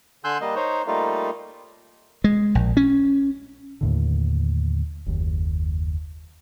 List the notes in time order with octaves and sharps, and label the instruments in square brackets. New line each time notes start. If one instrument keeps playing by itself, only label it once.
[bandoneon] D3 G#5 C6 E6 F#6 G6
G3 A#3 D#5
D#4 C5 C#5
G3 A3 A#3 D#4 F4
[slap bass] G#3
A#1
C#4
[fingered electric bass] D#2 A2 D3
F#1 D#2